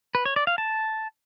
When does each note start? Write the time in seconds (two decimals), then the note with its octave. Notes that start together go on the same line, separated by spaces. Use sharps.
0.15 B4
0.25 C#5
0.36 D5
0.47 F5
0.58 A5